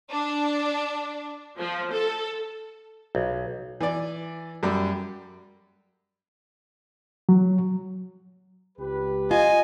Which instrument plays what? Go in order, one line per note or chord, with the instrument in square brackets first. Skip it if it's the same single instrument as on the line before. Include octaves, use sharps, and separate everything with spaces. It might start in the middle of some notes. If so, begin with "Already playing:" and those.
[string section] D4
F3
A4
[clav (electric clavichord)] B1
[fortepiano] E3 D5
F#2 G3 D6
[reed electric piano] F#3
[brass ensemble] C#2 G4 B4
[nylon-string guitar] F4 [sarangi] D#5 [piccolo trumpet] G#5